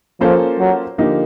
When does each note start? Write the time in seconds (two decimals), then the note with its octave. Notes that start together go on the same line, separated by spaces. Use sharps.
0.21 F3 A#3 C#4 F4 A4 C5
0.59 F#3
0.98 D3 F3 A#3 D#4 G4